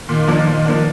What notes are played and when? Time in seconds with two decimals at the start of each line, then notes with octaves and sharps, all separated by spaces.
0.09 A#2 D#3
0.27 F3 A#3 D4
0.47 A#2
0.65 F3 A#3 D4